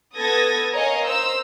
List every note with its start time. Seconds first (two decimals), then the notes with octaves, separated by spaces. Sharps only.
0.16 B3 A4 D#6 G#6 A#6
0.72 A#4 C#5 D#5 F5 G#5
1.04 C5 A#5 E6